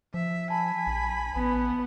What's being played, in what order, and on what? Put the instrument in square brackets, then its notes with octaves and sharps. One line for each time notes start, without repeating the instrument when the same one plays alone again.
[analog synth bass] F3 [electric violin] E5
[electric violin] G#5 B5 [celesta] A5
[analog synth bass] A#1
[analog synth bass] A1 [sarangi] B3